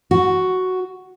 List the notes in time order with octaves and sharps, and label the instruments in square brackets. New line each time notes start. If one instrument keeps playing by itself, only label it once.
[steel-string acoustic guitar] F#4